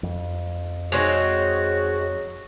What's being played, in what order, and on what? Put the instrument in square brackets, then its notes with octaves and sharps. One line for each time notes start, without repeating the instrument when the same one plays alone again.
[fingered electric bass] F2
[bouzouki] G#3 C4 D#4 [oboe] F#4 [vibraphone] C#5